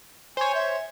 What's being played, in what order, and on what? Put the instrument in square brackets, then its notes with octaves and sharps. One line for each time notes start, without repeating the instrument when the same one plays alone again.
[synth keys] C5 C#5 [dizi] G#5
[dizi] E5